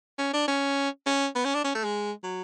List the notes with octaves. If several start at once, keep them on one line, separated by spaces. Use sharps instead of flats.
C#4
D4
C#4
C#4
B3
C#4
D4
C#4
A3
G#3
F#3